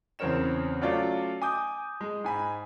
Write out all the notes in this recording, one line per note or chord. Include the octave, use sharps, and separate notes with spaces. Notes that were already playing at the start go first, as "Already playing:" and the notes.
E2 C#3 C4 A#4 C#5 E7
F#3 A3 C#4 F4 D5
G#5 D6 D#6 G6
G#3
G#2 G#5 B5